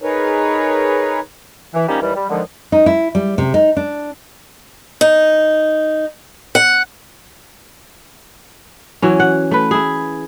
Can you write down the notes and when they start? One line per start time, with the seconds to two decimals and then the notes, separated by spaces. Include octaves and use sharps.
0.02 D#4 G#4 A#4 B4 C#5
1.74 E3
1.88 D#3 F3 G3 A#3 C#4 D#4
2.02 D#2 E3 G3
2.15 G3
2.30 D3 D#3 F3 G#3
2.72 D#4
2.86 E4
3.15 G3
3.38 C3
3.54 D#4
3.77 D4
5.01 D#4
6.55 F#5
9.02 E3 F#3 C#4
9.20 F#5
9.51 A3 B4
9.71 E4 G#4